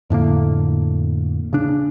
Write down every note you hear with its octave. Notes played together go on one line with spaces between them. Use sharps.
F2 A2 D3 A#3
C#3 D4